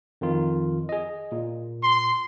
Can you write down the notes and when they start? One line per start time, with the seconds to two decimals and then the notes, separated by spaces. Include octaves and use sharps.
0.21 F2 D#3 F4
0.89 G#4 D#5
1.32 A#2
1.83 C6